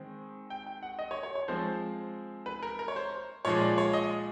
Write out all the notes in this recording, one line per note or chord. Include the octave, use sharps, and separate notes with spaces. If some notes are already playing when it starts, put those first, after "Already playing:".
Already playing: D#3 G#3 C4
G5
G5
F#5
D#5
C#5
C#5
C#5
F3 G#3 C4 C5
B4
A#4
A#4
C#5
C5
A#2 F3 G#3 C#5
D5
C#5
D#5